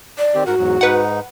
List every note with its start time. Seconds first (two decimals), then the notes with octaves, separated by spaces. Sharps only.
0.18 D5
0.35 D#3 C4 G4
0.46 G#2 F#4 A#4 F#5
0.58 E2 G#2 F#3
0.81 G#2 D#4 B4 F#5